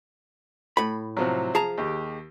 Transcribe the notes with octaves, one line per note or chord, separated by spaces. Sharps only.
A2 B5
C3 F3 F#3
F3 G#4 A5 A#5
D#2 G4